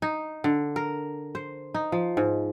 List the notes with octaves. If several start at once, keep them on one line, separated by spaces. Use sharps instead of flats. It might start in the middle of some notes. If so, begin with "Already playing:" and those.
D#4
D3
A#4
C5
D#4
F3
G#2